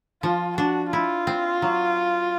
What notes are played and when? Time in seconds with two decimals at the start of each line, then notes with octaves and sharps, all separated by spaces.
0.23 F3 F4
0.58 D4 F#4
0.93 E4 F4
1.27 C4
1.62 F#3